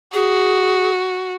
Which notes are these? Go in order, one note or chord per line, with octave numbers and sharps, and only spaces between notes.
F#4 G#4